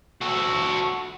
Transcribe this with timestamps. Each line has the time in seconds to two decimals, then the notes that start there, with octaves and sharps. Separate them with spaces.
0.22 F#4 A4